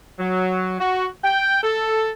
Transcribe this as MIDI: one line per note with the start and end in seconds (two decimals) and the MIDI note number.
0.19 0.76 54
0.80 1.07 66
1.24 1.60 79
1.63 2.11 69